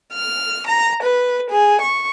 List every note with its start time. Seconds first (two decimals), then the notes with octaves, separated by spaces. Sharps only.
0.15 F6
0.67 A#5
1.03 B4
1.51 G#4
1.82 C#6